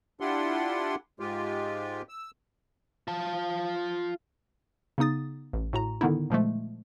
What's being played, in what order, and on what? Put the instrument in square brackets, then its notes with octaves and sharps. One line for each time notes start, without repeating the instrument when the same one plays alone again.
[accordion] D4 E4 F4 G4 F#5 C6
G#2 G#3 F4 G4
E6
[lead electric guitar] F4 A5
[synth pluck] C#3 B3 D#4 D#6 A6
A1
A2 F#4 A#5
D3 D#3 B3 D#4 E4
A#2 F3 G#3 A3